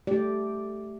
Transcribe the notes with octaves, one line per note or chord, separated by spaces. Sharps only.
A3 G4 D5